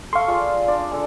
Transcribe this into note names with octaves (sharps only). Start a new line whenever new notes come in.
A4 F5 C6 C#6
F4 G#4 D5
D4 D5
G#3 D4 A4